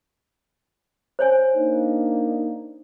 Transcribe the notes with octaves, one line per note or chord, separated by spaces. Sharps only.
C5 C#5 G#5
A#3 D4 D#4